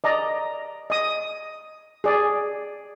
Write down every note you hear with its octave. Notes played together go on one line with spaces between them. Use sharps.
D5 D#5 A#5
D#5 D#6
G#4 D5